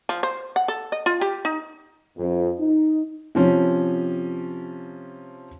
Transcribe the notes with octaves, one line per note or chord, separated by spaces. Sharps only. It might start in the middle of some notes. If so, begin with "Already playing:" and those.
F3
C5
F#5
A4
D#5
F4
G4
D#4
F2
D#4
C3 F3 C#4